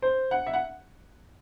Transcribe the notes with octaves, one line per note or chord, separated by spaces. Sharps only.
C5
F#5
E5
F#5